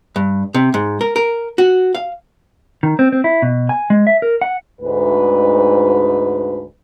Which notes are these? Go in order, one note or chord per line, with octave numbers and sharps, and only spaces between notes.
G2
C3
G#2
A#4
A#4
F#4
F5
D#3
C4
C4
E4
B2
G#5
G#3
E5
A#4
F#5
D2 G#2 B4